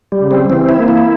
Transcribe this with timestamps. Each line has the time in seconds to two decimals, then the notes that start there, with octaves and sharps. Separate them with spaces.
0.12 G3
0.21 C#3
0.31 C4
0.50 E3 C4
0.69 E4
0.79 A#3
0.88 E4